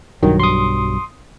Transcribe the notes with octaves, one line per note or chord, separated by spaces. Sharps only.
B1 G2 D#3 F#3
C6 D#6